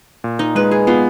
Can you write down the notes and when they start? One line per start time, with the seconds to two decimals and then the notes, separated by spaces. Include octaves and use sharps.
0.24 A#2
0.39 D#4
0.55 G#3 B4
0.71 G#4
0.87 B3 F4